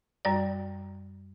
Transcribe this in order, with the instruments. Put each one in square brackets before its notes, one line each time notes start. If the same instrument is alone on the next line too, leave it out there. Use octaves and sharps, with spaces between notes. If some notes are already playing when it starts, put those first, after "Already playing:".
[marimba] F#2 G3 D5